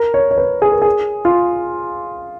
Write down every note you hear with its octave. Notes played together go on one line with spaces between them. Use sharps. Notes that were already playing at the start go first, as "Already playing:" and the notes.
Already playing: A#4
C#5
C#5
B4
G#4
A#4
G#4
F4